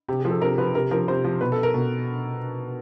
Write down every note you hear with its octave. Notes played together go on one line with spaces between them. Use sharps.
C3 G4
G#4
F3
A4
C3 A#4
F3 B4
C3 A#4
F3 A#4
C3 C5
F3
B2 B4
A4
A#4
B2